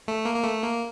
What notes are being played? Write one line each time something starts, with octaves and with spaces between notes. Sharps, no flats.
A3
A#3
A#3
A3
A#3